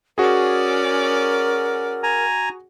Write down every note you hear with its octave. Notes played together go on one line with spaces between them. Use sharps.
C#4 F#4 G#4 A#4 D5
G#5 A#5